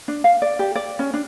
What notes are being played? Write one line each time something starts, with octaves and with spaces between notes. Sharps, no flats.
D4
F5
D5
G4
D5
C#4
D4